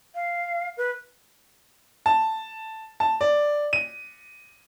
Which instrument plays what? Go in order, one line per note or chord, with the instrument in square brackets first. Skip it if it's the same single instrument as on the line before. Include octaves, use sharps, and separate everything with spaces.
[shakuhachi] F5
B4
[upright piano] A5
A5
D5
D#7